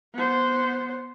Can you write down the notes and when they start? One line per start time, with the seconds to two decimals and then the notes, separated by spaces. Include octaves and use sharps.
0.14 B3 C5